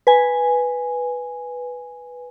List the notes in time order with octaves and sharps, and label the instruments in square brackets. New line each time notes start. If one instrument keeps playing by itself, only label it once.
[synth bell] B4 G#5